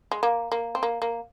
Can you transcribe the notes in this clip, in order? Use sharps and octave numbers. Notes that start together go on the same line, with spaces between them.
G#3
A#3
A#3
C4
A#3
A#3